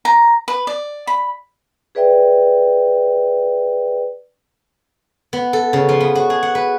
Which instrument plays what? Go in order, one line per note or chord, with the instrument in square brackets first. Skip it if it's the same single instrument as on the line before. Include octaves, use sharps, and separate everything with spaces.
[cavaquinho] A#5
B4
D5
B5
[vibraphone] G#4 B4 D5 E5 G5
[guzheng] B3
A4
C#3
F3
B3
F#4
G#4
F#5
B4